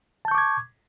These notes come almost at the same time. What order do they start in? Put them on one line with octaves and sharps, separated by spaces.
A5 G6 C#6 D6 G#6